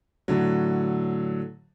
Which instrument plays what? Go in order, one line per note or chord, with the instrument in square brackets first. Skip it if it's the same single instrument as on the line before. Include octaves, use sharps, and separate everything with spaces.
[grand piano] A2 D3 F#3